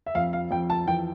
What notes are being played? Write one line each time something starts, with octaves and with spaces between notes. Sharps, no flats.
E5
F2 F5
F5
F2 G5
A5
E3 G5